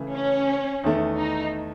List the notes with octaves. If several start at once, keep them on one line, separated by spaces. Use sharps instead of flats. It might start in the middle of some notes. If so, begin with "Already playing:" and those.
Already playing: C#3 E3 A3
C#4
E2 D#3 A3
D#4